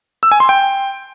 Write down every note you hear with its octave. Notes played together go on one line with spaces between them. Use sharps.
E6
G#5
C6
G5